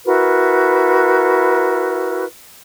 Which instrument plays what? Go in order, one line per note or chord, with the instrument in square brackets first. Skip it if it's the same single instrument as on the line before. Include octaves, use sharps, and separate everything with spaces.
[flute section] E4 F#4 A#4 B4